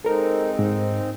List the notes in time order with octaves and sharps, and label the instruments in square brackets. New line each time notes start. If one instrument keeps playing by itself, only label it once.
[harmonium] G#3 C4 D#4 [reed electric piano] A4 A#4
[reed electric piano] G#2